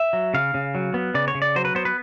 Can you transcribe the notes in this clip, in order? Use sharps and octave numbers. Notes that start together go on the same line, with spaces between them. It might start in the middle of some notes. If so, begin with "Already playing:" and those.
Already playing: E5
F#3
C#3 F5
C#3
F#3
B3
C#3 D5
C#5
C#3
D5
F#3 C5
B4
B3 C5
B4